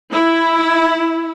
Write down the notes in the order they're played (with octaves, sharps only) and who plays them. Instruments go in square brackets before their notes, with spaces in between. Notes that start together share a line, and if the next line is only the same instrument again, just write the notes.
[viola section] E4